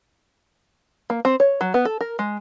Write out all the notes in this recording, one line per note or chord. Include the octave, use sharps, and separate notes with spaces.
A#3
C4
C#5
F#3
B3
A4
A#4
G#3